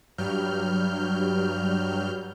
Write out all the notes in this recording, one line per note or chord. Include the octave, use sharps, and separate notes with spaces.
G2 F#3 G3 F6 G6